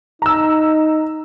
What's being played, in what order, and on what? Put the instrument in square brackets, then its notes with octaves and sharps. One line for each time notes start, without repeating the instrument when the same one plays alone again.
[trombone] D#4 [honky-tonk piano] A#5 E6